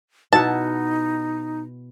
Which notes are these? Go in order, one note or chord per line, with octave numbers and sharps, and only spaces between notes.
B2 D#4 E4 F#5 A5